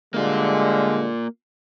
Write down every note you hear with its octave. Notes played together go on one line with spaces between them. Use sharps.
D3 G3 G#3 A#3 F4